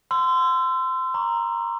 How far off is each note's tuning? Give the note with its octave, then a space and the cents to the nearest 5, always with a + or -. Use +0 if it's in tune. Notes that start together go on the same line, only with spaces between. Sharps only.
C6 -20 E6 +25
A#5 +0 C#6 +15